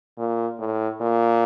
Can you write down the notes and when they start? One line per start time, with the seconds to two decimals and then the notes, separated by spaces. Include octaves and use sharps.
0.18 A#2
0.59 A2
1.01 A#2